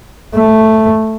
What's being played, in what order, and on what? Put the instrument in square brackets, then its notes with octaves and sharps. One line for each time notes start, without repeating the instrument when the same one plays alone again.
[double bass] A3